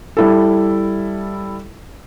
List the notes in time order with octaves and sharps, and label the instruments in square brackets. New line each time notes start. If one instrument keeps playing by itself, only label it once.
[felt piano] G3 E4 A4